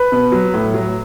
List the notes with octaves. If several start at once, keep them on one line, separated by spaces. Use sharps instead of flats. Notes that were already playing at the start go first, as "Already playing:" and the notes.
Already playing: B4
B2
F#3
A2
F#3